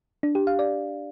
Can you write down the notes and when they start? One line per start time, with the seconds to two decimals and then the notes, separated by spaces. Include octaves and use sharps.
0.23 D4
0.35 G4
0.47 F5
0.59 D5